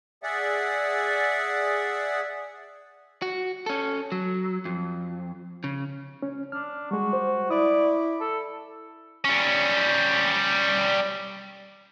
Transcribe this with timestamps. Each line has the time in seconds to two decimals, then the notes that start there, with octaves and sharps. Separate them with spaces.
0.23 G#4 D5 E5 F#5
3.22 F#4
3.66 C#4 A4
4.12 F#3
4.65 F2
5.64 C#3
6.22 C#4
6.52 D4 F6
6.91 G3 G#3 F#4
7.13 C5
7.50 E4 D5 D#6
8.21 A4
9.25 G3 C#4